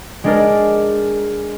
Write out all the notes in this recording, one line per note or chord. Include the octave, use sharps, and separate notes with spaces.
G#3 D4 A#4